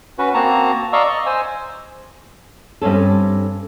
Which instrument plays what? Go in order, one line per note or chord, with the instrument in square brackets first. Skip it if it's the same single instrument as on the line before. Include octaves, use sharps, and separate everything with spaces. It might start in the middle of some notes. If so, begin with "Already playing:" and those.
[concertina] C#4 F#4 B4
A#3 C4 F#4 A5 A#5
D5 D#5 F5 A#5 C#6 E6
D#5
C5 G#5 E6
[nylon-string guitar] G2 C4 C#4 A4